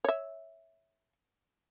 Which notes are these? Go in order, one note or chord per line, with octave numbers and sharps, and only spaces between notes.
C#5 E5